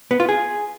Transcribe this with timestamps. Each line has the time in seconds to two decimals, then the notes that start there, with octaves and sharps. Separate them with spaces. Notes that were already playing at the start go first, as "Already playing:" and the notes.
0.11 B3
0.20 F4
0.29 G#4